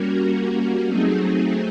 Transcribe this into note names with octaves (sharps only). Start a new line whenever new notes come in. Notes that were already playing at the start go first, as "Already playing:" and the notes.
Already playing: G3 A#3 C#4 F#4 A#4
F#3 A3 C4 D#4 G#4